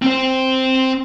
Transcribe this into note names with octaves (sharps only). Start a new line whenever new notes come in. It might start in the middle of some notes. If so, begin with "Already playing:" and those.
C4 C5